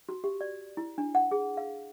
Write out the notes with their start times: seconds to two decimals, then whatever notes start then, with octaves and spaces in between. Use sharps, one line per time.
0.09 F#4
0.24 G4
0.41 D5
0.77 E4
0.98 D4
1.15 F#5
1.31 G#4
1.57 F5